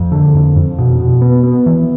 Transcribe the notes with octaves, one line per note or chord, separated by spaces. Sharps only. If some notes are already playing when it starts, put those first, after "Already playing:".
Already playing: F2
D3
F2
F2
B2
B2
B3
B3
E3